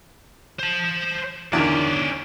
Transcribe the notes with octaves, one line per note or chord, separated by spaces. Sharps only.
C5 A5
E2 D3 D#3 C#4 D5